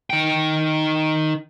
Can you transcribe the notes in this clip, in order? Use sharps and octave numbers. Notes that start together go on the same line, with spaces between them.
D#3 G5